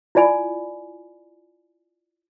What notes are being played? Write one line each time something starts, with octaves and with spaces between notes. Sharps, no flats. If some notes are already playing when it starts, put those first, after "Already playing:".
E4 F4 D5 G#5 B5